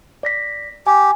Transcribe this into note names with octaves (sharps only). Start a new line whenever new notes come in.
D5 A#6 B6
G4 G#5